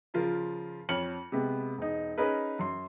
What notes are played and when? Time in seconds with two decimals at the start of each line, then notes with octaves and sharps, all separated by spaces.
0.14 C#3 F3 F4 A#4
0.89 F2 C#5 F6 C#7 F#7
1.32 C3 G#3 B3
1.78 E1 D#4
2.18 C#4 D#4 G#4 A#4 B4
2.59 F#2 C6